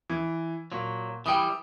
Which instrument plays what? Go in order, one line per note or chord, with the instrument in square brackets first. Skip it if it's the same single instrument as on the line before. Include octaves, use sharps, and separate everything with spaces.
[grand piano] E3
[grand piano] A#2 [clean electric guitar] F#3
[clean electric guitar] E3 G3 [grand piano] G5 D#6